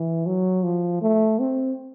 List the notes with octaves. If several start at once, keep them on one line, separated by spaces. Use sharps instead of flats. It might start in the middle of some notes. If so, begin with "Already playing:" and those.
Already playing: E3
F#3
F3
A3
C4